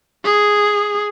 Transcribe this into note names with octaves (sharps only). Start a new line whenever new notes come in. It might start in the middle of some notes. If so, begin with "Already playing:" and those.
G#4